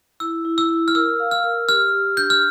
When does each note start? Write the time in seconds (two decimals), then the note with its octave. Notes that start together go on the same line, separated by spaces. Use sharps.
0.20 E4 E6
0.45 E4
0.58 E6
0.70 E4
0.88 F6
0.95 A#4 E6
1.20 F5
1.31 F6
1.44 A#4
1.68 G4 F6
1.93 G4
2.17 D4 G6
2.30 F6